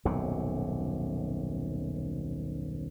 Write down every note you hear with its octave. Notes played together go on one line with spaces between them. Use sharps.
D#1 B1 F#2 C3